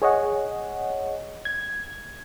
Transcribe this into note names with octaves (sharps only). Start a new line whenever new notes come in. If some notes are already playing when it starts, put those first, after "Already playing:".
G#4 C#5 D#5 F#5
G#6